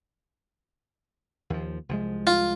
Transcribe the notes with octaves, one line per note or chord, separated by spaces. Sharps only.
D#2 F3
C2 F3 G#3
F4